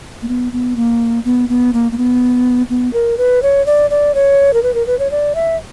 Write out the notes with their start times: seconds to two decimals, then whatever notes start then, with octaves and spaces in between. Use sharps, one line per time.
0.22 A#3
0.28 B3
0.53 B3
0.76 A#3
1.25 B3
1.49 B3
1.73 A#3
1.92 A#3
1.98 B3
2.70 B3
2.93 A#4
3.18 B4
3.43 C#5
3.66 D5
3.90 D5
4.15 C#5
4.53 A#4
4.63 B4
4.74 A#4
4.87 B4
4.99 C#5
5.11 D5
5.35 E5